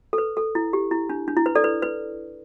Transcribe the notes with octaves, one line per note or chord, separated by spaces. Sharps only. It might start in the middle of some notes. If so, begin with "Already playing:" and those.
A4
B4
A4
E4
G4
E4
D4
D4
E4
B4
A4 D5
B4
B4